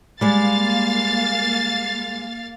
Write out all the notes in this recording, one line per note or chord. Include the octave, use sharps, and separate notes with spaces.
G3 G#3 A#3 F5 A6